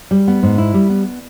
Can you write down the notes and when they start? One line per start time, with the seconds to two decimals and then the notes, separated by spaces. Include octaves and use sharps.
0.11 G3
0.28 B3
0.43 G#2
0.58 E4
0.74 G3
0.90 B3